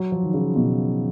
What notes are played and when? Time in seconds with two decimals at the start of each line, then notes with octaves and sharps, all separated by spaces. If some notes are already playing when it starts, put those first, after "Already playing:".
Already playing: F#3
0.12 F3
0.23 D#3
0.34 C#3
0.56 B2